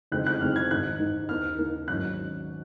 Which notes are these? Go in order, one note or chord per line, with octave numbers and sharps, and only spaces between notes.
F#1 F2 D#3 G#3 C4 F#6
F#6
F#1 F2 D#3 G#3 C4 F6
G#6
G#1 G#2 D#3 F#6
G#1 G#2 D#3
D#2 D#3 A#3 D#4 F6
D#2 D#3 A#3 D#4
G#1 G#2 F#3 C#4 F#6